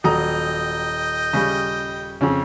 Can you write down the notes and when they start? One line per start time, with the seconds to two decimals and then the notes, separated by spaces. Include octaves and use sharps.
0.04 D#1 F#3 D#5 G5 A#5 D#6
1.33 C#3 G3
2.21 F2 C#3 C#4